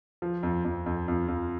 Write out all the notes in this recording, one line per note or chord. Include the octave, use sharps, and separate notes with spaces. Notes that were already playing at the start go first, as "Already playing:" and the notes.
F3
F2
F2
F2
F2
F2